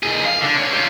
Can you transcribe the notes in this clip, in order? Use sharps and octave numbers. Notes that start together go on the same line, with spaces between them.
D#2 G#4
F5
D3 D4
C#2 C#5
G3 F4